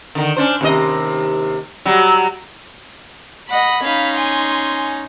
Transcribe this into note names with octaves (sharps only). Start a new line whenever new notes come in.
D3 D#3
C#4 D4 C5
D#2 C3 D#5
F#3 G3
D#5 F#5 B5
C#4 D#4 F5 B5
G#5 C6